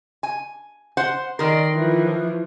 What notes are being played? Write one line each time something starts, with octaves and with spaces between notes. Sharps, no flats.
G#5
C5 F#5
D#3 A#4 D5 C6
E3 F3